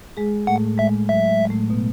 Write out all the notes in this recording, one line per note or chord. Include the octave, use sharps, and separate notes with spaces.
G#3 G#4
A2 A3 F#5
G#3 E5
F#3 E5
G#3
A2 A3
B2 B3